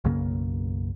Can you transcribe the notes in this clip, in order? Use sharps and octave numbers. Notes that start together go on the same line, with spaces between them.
B1 F#2 C#3 A#3